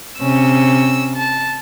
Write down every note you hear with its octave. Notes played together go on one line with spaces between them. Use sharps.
C3 C#4 E6
A5